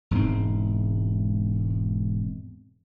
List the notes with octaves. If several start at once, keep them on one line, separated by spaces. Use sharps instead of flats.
E1 G#2 G3 C4